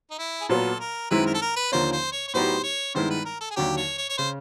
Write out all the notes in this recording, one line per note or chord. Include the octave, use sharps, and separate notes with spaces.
D#4
E4
G#4
A#2 F#3 B3 A4
A#4
F#2 D#3 G#3 C4 E4 B4
A#4
A4
A#4
B4
D#2 D3 F3 A#3 C#4 C5
C5
C#5
C#5
A2 F#3 B3 D#4 G4 C5
C#5
G2 D#3 G#3 B3 E4 C5
B4
A#4
A4
G#4
D#2 D3 F#3 G4
C#5
C#5
C#5
C#3 C5